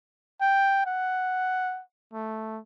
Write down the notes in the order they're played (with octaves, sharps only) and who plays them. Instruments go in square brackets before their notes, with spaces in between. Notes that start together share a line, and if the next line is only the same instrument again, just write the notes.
[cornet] G5
F#5
A3